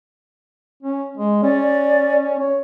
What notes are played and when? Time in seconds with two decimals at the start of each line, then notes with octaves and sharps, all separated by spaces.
0.83 C#4
1.18 G#3
1.43 C#4 D5
2.39 C#5